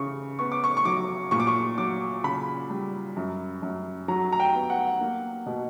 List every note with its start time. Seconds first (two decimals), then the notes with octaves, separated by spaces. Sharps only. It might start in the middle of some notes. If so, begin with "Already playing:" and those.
Already playing: C#3 E3 C#6
0.39 B3 C#6
0.52 D6
0.64 C#6
0.77 C#6
0.85 F#3 D6
1.31 A#2 C#6
1.40 D6
1.47 C#6
1.78 F#3 D6
2.24 C#3 B5
2.70 G3
3.16 F#2
3.62 F#2
4.08 F#3 A#5
4.32 A#5
4.40 G5
4.55 B3
4.70 F#5
5.01 A#3
5.46 B2